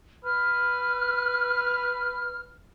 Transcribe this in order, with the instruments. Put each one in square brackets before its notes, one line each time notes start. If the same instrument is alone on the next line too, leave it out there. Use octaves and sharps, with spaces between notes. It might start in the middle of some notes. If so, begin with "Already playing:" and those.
[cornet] B4 [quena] F6